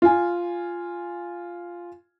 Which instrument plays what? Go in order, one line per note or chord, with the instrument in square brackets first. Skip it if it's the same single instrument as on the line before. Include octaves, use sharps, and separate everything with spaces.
[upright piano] F4 G#5